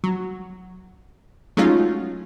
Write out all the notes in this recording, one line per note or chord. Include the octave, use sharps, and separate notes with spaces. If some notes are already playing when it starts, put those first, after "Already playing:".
F#3
F#3 G#3 A3 C#4 D#4 F4